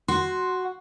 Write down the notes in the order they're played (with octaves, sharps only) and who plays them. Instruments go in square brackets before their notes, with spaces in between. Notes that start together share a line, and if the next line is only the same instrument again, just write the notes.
[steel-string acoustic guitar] F#4 [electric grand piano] C6